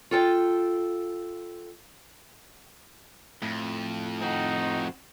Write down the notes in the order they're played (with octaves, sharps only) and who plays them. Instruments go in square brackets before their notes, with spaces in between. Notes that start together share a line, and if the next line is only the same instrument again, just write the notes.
[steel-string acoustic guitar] F4 A4 G5
[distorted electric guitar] F2 [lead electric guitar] A2
[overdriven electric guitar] C4 F#4 [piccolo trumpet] D#4